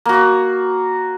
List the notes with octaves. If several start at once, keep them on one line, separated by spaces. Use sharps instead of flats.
A#3 F#4